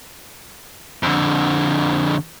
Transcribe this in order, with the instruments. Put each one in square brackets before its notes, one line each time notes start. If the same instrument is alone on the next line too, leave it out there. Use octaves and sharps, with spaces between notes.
[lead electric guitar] F2 D3